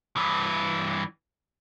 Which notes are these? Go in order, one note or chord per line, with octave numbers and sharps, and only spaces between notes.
G2 E3